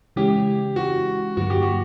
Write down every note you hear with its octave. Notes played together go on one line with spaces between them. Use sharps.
C#3 E3 G#3 C#4 E4 G4
F#4
G2 D3 F#3 A#3 F#4
G4
F#4